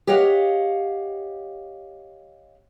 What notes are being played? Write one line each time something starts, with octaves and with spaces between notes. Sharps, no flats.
G4 C#5 D#5 F5 F#5